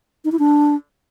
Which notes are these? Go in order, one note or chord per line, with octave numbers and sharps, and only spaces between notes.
D#4
E4
D4